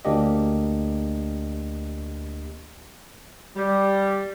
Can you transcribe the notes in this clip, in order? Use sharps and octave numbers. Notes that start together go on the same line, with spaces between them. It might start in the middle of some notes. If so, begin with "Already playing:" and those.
D2 A#3 D4 G4 D#5
G3